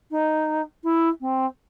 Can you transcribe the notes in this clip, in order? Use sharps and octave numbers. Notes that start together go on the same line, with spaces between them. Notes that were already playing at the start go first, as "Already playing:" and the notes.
D#4
E4
C4